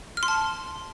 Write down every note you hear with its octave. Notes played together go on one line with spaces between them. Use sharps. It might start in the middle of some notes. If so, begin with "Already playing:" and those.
F6
C6
A5